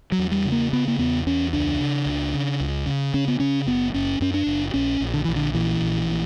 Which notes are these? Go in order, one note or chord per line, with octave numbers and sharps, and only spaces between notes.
F#3
E2
G3
C#3
A#3
C#3 B3
A#3
E2 B3
E2 C#4
C#2 D4
C#3
C#2
C#3
C#2
C#3
C#3 C#4
B3
C#3 C#4
F#1 B3
F#1 C#4
F#2 C#4
D4
F#1
A#1 C#4
A#1
D3
A#1 E3
D3
A#2 E3
A#1
A#2